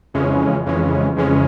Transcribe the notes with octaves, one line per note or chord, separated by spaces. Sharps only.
F2 C#3 E3 G#3 C#4
F2 C#3 E3 G#3 C#4
F2 C#3 E3 G#3 C#4